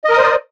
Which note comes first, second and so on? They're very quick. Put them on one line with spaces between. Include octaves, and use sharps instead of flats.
D#5 A#4 D#6 C5 D5